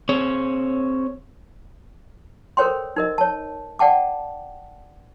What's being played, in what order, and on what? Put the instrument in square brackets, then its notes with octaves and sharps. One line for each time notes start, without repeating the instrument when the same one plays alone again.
[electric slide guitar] C4 G#4 C#5
[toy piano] A4 A#4 C5 C#5 G5 C6
D#4 A#4 D#5
C#5 A5
D5 F#5 G5 A5 D6